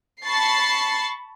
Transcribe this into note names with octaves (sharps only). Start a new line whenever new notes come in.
A5 B5 C#6 A6 C7